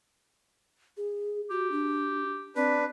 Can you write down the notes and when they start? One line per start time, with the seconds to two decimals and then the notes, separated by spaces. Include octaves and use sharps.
0.97 G#4
1.50 F#4 G4
1.71 D4
2.56 C4 D4 B4